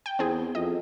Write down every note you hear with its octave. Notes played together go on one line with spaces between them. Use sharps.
G5
E2 C4 G#4
F2 D#5